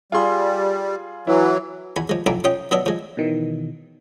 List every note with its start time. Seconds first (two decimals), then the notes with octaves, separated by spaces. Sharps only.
0.12 G3 F4 G#4 C6
1.27 E3 F#3 E4
1.96 E2 G#5 B5
2.09 F3 G#3
2.26 B1 F2 E4 G#5 A#5 D6
2.44 C#4 F4 D#5 G5
2.71 F#3 B3 D4 D#5 E5
2.86 F3 G#3
3.17 B2 D#3 E3